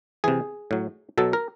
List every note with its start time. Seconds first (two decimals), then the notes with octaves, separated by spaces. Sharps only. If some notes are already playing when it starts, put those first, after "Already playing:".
0.24 C3 E3 G#4
0.71 A2 F#3
1.18 B2 F#3 A4
1.33 A#4